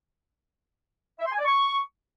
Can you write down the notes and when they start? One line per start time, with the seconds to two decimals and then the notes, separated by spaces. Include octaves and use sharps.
1.19 E5
1.26 C6
1.32 G#5
1.39 D5
1.45 C#6